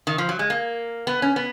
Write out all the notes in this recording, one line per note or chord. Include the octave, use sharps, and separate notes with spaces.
D#3
F3
F#3
G#3
A#3
B3
C#4
B3